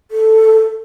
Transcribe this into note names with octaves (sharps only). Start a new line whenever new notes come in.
A4